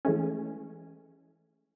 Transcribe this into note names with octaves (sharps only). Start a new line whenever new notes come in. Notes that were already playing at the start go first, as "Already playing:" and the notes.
E3 G#3 A3 C#4